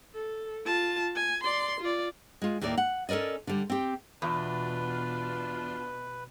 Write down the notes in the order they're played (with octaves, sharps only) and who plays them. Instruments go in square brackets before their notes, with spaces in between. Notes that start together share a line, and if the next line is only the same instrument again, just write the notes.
[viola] A4
F4 A5
G#5
D5 C6
F4 D5
[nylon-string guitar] G#3 F4
D#2 A2 A#3 D5
F#5
C#4 A4 A#4 D5 D#5
D3 G3
C4 G4
[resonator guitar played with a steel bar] E2 [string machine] B2 [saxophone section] D4 F4 [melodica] B4